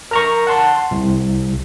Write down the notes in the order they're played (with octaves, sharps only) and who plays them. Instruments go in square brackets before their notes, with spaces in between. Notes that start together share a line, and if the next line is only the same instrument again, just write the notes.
[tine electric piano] A#4 A#5 C#6
F#5 A5 C6
C2